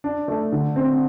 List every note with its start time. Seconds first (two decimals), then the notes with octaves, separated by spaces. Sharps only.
0.04 D4
0.28 A3
0.52 D3
0.76 C4